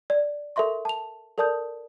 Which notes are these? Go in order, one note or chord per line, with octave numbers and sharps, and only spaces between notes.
D5
A4 A#4 E5 C6 C#6
A5 F7
A4 A#4 D5 A5 D#6 G6